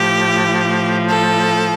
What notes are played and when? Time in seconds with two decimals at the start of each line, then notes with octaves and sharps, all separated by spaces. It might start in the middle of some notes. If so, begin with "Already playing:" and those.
Already playing: A2 F3 G4
1.09 A4